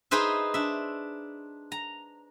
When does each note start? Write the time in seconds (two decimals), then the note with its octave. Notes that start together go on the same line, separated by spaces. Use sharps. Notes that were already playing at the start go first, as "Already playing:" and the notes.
0.11 D#4 G#4 B4 C5 E5
0.54 D4 E5
1.72 A#5